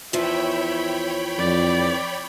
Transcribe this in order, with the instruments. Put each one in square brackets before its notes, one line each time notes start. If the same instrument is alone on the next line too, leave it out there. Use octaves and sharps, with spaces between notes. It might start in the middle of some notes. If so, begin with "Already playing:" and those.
[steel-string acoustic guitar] E2 E3 F3 [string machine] C#5 G5 B5 [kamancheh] E5
[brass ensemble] F2 [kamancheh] D5